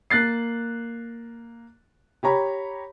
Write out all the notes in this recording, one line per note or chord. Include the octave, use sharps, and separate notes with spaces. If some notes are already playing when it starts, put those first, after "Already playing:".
A#3 F#6 A6 C7
G4 C#5 A#5 B5